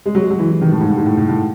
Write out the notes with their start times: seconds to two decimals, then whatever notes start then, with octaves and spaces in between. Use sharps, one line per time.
0.06 G#3
0.15 F#3
0.22 G#3
0.30 F#3
0.38 E3
0.51 E3
0.62 D#3
0.72 A2
0.80 G#2
0.89 A2
0.97 G#2
1.06 A2
1.17 A2
1.29 A2